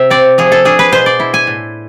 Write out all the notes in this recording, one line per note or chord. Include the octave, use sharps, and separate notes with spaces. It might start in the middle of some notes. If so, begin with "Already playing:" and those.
Already playing: C3 E5
C4 D5
F3 G#4
A4
D4 G#4
B4
B2 C5
D5
E4
G#5
A2